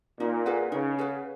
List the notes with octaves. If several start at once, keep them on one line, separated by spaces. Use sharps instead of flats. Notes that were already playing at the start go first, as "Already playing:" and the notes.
A#2 D#4
G#4 B4 F#5
C#3 D#4
G#4 B4 F#5